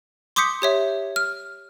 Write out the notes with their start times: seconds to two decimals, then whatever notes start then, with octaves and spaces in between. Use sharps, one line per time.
0.36 C6 D6 D#6 G6 B6 C#7
0.62 G4 C#5 E5
1.16 F6